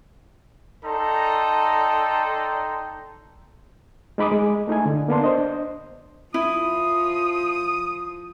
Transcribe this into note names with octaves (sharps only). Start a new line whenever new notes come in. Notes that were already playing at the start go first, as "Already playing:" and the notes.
D#4 A4 D5 G5 A#5 C6
G#3 D#4 B5 D6 D#6
G#3
A3 D#4 E4 G#5
D3
A#3 B3 D4 C6
D4 C5 D#5
F3 E4 D#6